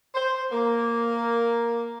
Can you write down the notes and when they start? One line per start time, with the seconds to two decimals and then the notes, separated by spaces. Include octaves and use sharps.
0.15 C5
0.52 A#3